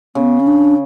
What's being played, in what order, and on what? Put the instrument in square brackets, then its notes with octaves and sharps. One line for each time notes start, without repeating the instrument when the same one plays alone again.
[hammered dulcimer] C#3 [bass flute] B3
[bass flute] C#4
D4